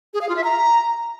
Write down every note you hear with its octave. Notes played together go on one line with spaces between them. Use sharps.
G#4
F5
F4
E5
A#5